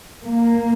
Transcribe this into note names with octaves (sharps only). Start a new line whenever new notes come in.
A#3